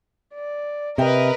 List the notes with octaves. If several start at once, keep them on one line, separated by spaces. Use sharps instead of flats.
D5
C3 A#4 B4 D#5 E5 G5